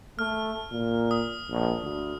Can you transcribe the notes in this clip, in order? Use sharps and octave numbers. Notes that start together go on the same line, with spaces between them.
A3 F6
A#2
D#6
A#1
D2